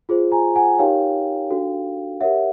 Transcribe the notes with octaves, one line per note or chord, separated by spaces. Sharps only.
F4 G#4 C5
G#5 A#5
F#5 G#5
D#4 G4 A#4 C#5 F5 G5
D4 F#4 A4
G4 A#4 C#5 E5 F#5